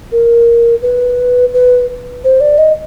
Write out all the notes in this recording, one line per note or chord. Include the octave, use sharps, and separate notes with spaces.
A#4
B4
B4
C5
D5
D#5